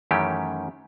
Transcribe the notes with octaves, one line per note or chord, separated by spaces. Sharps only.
F#2 D#3 E3 A3 C#4 G4